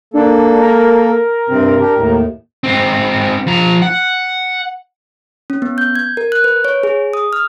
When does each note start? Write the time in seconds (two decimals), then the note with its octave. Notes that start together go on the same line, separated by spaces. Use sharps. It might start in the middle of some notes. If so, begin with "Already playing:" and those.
0.14 A#3 D4 A4
0.62 A#4
1.49 G2 C3 C4
1.80 D4 G4
1.96 D#2 A2
2.64 G#2 C4
3.47 F3 A#5
3.82 F#5
5.50 C#4
5.62 B3
5.78 G6
5.95 G#6
6.17 A#4
6.32 F#6
6.44 B4
6.65 C#5
6.83 G#4
7.13 D#6
7.33 F6